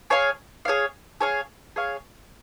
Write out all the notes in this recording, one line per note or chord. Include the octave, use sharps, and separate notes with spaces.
G#4 C#5 F5
G#4 C#5 F5
G#4 C#5 F5
G#4 C#5 F5